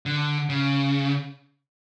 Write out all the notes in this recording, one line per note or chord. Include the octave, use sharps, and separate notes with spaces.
D3
C#3